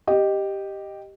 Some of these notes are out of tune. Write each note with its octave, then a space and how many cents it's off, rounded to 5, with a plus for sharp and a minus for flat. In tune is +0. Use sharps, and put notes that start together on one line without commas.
G4 +0 D#5 -10